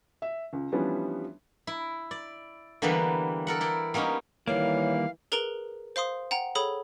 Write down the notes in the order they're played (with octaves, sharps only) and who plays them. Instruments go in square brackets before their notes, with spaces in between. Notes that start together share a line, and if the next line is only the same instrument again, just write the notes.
[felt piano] E5
C#2
E3 F3 G3 B3 C#4 D4
[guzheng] E4
D5
D3 E3 G3 A#3 B3 B4
A4 A#4 F#5
E4 D5 G5
G3 A#3 B3 C#4 D#4
[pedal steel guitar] D#3 G3 A#3 [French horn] E3 [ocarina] C#5 [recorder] F5
[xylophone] G#4 A#4 B4 A#5 D7 F7
C5 F5 C6 D#6
F#5 G5 A#5
G#4 A4 C#5 B5 D#6